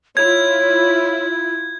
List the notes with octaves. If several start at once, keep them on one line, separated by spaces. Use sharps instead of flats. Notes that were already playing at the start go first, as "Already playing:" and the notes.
E4 F4 C#5 G#6